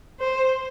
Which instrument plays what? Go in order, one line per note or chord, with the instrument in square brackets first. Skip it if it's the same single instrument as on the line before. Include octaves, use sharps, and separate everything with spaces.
[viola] C5